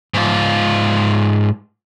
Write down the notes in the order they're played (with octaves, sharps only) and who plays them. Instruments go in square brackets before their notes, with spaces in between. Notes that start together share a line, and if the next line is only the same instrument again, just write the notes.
[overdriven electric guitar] G#2 F4